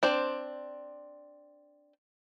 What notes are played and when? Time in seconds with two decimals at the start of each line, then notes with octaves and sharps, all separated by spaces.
0.03 C4 D4 C5